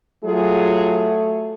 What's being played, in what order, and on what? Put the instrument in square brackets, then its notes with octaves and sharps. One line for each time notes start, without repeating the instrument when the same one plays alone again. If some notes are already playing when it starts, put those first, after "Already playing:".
[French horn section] F#3 F4 G#4 [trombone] A3